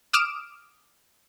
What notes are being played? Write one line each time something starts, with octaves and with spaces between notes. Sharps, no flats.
D6 D#6 F6 D7 E7